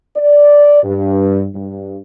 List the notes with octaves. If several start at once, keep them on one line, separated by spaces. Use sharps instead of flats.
D5
G2
G2